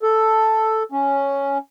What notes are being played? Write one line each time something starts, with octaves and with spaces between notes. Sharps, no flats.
A4
C#4